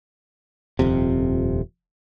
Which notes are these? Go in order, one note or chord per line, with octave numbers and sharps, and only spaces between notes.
D#1 F2 C3